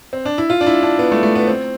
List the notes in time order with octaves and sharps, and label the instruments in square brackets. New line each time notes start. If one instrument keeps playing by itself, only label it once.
[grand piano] C4
D4
E4
F4
D4
E4
D4
B3
A3
A3
B3
C4